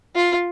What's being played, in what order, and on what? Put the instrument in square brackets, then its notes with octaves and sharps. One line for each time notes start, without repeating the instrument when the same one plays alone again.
[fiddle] F4